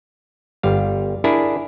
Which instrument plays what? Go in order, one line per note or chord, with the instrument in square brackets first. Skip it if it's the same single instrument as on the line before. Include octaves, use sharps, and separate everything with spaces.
[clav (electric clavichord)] G1 G3 F5
D4 E4 G#4 A#4